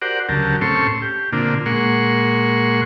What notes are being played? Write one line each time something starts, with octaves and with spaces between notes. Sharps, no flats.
F#4 G4 A#4 C5 D5 F#5
D2 C#3 F#3 G4 A#4 A5
A2 C4 C#4 A4 C6 C#6
G4
A#2 D3 A#3 C4 D4 F4
A#2 G#3 A#3 F#5 C6 C#6